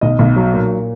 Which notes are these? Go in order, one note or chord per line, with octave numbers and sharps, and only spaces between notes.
B1 D#5
B1
F#3
A#2